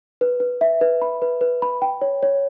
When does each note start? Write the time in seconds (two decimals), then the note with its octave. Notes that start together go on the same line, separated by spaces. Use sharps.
0.21 B4
0.40 B4
0.61 E5
0.81 B4
1.02 B5
1.22 B4
1.41 B4
1.62 B5
1.82 G5
2.02 C#5
2.23 C#5